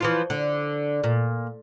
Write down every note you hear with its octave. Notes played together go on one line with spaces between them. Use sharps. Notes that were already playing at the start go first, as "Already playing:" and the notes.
E3 F3 F4
D3
A#2